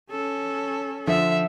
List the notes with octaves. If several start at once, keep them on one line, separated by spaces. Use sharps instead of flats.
C#4 A4
D3 F3 E5